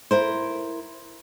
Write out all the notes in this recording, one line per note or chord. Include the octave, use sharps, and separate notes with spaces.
E4 A#4 C5